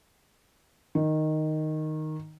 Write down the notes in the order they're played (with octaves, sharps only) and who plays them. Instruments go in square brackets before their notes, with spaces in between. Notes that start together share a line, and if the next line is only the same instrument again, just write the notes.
[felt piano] D#3